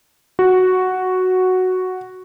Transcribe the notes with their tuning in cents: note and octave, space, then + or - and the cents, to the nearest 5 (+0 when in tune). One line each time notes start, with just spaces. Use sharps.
F#4 +0